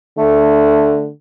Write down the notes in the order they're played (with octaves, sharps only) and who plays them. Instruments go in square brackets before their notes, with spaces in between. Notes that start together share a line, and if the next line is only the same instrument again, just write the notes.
[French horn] D3 [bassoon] A3